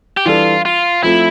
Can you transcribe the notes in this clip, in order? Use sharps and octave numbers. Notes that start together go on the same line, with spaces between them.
G4
E3 G3 D4 F4 A4
F4
F3 A3 C4 E4 F4